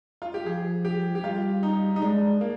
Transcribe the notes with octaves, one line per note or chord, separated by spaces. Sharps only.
F4
G4
F3 G#4
G4
G4
G3 F4
D#4
D#4
G#3 D4
A#3